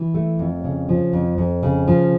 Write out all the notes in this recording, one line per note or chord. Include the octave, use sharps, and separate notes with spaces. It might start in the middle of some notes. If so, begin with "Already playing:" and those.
Already playing: E3
A3
F2
C#3
F3
F2
F2
C#3
F3